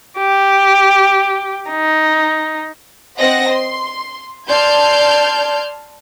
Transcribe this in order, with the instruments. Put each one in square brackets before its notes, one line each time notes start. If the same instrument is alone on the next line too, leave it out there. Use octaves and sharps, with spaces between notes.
[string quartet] G4
D#4
[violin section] C4 C5 D#5 F#5 A#6
C6
D5 A5 C6 F6 G6 G#6